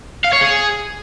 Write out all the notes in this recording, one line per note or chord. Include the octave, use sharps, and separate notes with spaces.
F5
C#5
G#4